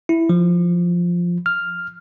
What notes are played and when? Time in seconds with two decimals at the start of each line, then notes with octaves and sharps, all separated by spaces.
0.09 E4
0.29 F3
1.46 F6